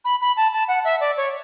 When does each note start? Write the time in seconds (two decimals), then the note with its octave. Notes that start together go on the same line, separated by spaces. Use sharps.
0.05 B5
0.21 B5
0.37 A5
0.53 A5
0.68 F#5
0.85 E5
1.00 D5
1.17 C#5